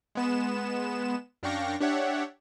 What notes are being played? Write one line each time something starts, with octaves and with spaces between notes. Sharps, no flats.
G#3 B3 E7
F#2 D4 F5 G5 C#6 A#6
D4 G4 C#5 E5 F#5